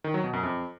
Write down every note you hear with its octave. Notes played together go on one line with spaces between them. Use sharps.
D#3
F#3
B2
F#2
F2